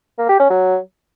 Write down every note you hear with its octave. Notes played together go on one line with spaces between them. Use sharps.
A#3
G4
C#4
F#3